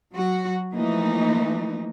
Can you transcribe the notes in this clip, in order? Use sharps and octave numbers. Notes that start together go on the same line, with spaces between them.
F#3 F#4
E3 F3 A3 A#3 D#4